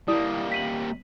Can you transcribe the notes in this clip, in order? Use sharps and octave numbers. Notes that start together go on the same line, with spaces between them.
G3 A#3 E4 D5 D#6
B6 D#7 F#7